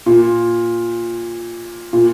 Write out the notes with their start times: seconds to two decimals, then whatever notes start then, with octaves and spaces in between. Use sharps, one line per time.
0.06 A#2
1.93 A#2